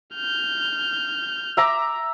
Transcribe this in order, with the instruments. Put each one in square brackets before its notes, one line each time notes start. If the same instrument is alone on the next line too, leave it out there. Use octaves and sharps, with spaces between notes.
[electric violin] F6 G6
[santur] E5 A#5 D6